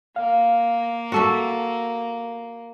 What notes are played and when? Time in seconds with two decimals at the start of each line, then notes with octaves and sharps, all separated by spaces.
0.16 A#3 F5
1.12 F#4 A4 E5